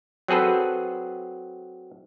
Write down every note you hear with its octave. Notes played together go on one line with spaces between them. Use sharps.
F#3 C4 G#4 A4 B4